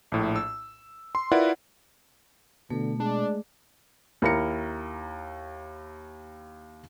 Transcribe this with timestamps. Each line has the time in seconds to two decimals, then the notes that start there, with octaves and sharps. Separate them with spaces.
0.12 A#1 A2
0.36 E6
1.15 C6
1.32 E4 F4 A#4 B4 D5 F#5
2.70 B2 D3 A3
3.00 G#3 D4
4.22 D#2 E4 A#4 A#5 C#7